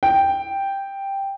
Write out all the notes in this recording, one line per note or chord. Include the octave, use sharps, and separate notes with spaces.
G5